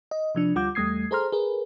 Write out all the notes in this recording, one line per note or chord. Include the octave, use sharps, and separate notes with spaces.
D#5
C3 F3 D4
D2 G3 F4 F#5 D6 G6
E2 G3 A3 D#6 G#6 C7
G#4 A4 C5 A#5 C6 F6
G#4 A#4 B4